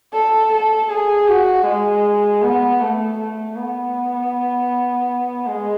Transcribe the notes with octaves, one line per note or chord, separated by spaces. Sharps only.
A4
A4
G#4
F#4
G#3
B3
A3
A3
B3
G#3